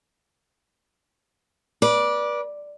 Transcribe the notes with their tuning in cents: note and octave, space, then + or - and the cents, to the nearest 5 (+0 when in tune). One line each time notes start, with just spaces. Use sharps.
B4 -35 D5 +0